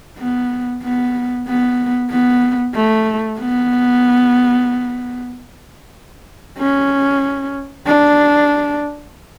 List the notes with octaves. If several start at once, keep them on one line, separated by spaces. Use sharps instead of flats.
B3
B3
B3
B3
A3
B3
C#4
D4